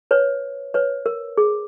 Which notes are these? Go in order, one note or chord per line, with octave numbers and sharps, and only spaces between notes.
B4 C#5
B4 C#5
A#4
G#4